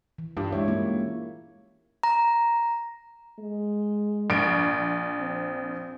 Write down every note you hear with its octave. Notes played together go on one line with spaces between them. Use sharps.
E3
G2 D4 F4 G4
G#3 E4 C#5
A#3 C#4
A#5
G#3
A#1 D7
C4